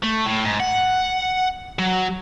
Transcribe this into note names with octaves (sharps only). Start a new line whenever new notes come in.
A3
A2
G#2
F#5
F#3